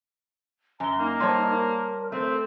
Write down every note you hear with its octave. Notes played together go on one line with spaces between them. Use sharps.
F#2 G#5 A#5 G7
A#3 D#4
G3 C5 C#5 A5 C6
A#4
A3 C4